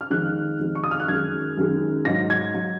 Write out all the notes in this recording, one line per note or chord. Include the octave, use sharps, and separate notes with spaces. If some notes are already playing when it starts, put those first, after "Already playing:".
F6
F2 D#3 G#3 F#6
F2 D#3 G#3
C#6
D#6
F6
F#6
F#2 D#3 G#3 G#6
F#2 D#3 G#3
G#2 F#3 A#6
G#6
F#3